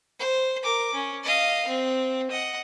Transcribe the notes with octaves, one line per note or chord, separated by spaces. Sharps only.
C5
A#4 D6
C#4
D#5 F5
C4
D#5 F#5